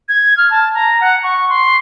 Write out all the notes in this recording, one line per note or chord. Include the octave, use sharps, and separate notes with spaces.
G#6
F6
A5
A#5
F#5
C#6
C6